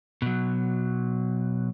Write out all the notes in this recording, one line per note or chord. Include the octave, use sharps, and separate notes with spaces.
B2 F#3